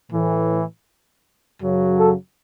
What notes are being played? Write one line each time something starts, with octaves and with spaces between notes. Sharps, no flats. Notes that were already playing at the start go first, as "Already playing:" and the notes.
A2 E3
F#2 C#3 F#3
A4